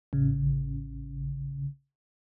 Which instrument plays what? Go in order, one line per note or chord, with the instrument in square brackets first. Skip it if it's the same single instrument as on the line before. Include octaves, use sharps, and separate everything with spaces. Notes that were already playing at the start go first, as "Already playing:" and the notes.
[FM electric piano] A1 C#3